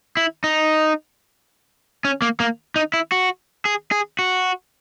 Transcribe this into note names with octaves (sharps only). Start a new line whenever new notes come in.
E4
D#4
C#4
A#3
A#3
D#4
E4
F#4
G#4
G#4
F#4